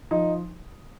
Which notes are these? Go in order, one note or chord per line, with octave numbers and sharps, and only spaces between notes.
F3 D#4